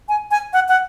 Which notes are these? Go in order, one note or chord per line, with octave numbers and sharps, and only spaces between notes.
G#5
G#5
F#5
F#5